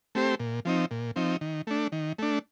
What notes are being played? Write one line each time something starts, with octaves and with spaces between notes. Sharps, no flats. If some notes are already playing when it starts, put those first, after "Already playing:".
A3 C4 G4 C5
A#2
F3 C4 D#4
A#2
F3 C4 D#4
D#3
A3 D4
D#3
A3 D4